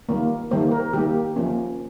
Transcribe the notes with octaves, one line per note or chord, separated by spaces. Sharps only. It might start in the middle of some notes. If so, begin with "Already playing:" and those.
D#3 G3 A#3
D#3 G3 A#3 C5
A#4
D#3 G3 A#3 G4
F3 A#3 C#4